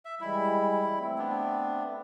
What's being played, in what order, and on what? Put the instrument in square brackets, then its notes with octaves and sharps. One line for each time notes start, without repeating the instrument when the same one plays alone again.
[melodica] E5
[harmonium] E3 G3 G#3 [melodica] E4
[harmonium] A3 C4
[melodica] B3 D4